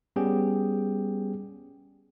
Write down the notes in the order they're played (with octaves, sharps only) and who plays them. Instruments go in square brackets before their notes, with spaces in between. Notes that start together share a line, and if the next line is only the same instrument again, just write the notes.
[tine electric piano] G3 B3 C#4 G4 G#4 G5